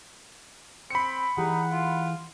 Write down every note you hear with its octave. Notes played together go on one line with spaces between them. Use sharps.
C4 B5 C#7
E3 D#4 G4 G#4 F#5
F4